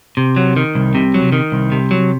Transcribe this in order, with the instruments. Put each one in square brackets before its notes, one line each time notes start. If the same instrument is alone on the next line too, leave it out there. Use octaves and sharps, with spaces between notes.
[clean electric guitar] C3
F#3
D#3
C2
C3
F#3
D#3
C2
C3
F#3